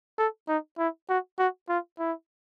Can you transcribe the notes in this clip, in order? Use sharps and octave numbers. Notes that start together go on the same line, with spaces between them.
A4
D#4
E4
F#4
F#4
F4
E4